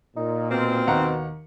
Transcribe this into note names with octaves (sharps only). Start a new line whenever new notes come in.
A#2 D#4
B2 D#3 A#3 C4
D#2 F#5 A#5